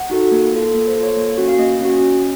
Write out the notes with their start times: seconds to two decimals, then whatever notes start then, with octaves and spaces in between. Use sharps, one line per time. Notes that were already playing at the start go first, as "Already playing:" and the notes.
Already playing: F#5
0.10 D#4 F#4 A4
0.32 A#3
0.53 F4 A4
0.75 A#3
0.88 C5
0.95 F4 A4
1.03 C#5
1.16 A#3
1.37 C#4 F#4
1.48 F5
1.59 A#3 D#5
1.81 C#4 F#4
2.02 C#4